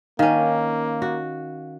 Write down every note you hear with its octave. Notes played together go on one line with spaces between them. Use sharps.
D#3 A#3 C#4 F5
F#4